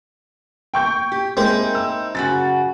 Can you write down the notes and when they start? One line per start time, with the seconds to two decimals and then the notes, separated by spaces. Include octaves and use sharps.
0.74 G5 C#6 G6
1.12 G4
1.37 G#3 A#3 C4 D#4 E4
1.75 E6
2.15 F#2 C#3 F#4 A6